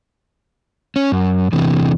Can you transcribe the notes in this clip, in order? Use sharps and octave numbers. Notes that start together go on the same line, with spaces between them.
C#4
F#2
E2 C3 E3